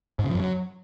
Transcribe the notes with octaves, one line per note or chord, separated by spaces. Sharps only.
G#2
C#3
F3
F#2
F#3